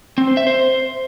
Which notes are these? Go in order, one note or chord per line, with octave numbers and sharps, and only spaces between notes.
C4
C5
E5
C5